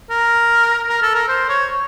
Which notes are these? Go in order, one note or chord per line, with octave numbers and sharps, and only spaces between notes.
A#4
A#4
A4
A#4
C5
C#5